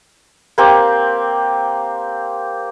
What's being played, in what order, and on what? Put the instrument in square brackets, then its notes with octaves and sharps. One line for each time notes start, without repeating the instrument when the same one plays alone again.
[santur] A#3 C4 G4